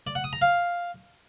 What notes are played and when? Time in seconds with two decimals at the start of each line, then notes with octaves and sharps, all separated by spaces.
0.07 D5
0.15 F#5
0.24 D#6
0.33 A#5
0.42 F5